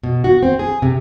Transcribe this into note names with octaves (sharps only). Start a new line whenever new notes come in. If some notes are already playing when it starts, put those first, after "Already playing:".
B2
F#4
C4
G#4
C3